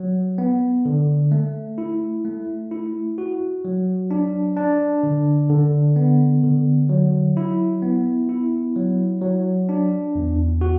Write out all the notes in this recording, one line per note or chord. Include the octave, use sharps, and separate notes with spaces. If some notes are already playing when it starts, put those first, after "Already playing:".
Already playing: F#3
B3
D3
A3
E4
A3
E4
F#4
F#3
D4
D4
D3
D3
B3
D3
F#3
E4
B3
E4
F#3
F#3
D4
E2
F#4